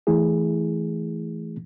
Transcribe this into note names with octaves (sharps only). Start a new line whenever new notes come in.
E3 A3 E4 G#4